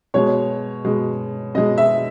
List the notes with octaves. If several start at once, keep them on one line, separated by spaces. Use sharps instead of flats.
B2 G#3 C#5
B2 G#3
B2 G#3 D#5
E5